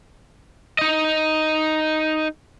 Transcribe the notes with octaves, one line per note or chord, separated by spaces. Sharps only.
D#4 D#5